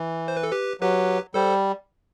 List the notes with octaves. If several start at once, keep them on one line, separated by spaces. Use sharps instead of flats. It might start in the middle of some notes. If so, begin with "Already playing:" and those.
Already playing: E3
C5
B4
A4
G4 B4
F#3 G4 B4
G3 A4 C5